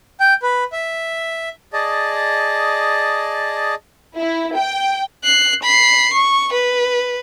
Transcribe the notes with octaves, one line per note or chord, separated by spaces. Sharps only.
G5
B4
E5
G#4 D5 D#5 A5
E4
G5
F#6 C7
B5 C7
C#6
B4